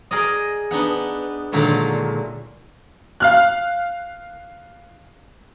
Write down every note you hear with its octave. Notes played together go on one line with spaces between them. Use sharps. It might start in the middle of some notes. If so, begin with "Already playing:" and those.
G#4 A#4 D5 D#5
B3 D4 D#4 F#5
A#2 D3 D#3 F#3 G#3 A3
F5 F6 F#6